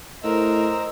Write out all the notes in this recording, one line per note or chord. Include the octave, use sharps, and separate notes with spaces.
A2 A#4 C5 D#5 A#5 E6